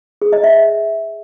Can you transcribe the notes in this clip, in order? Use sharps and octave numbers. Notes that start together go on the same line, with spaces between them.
G#4
D#5
E5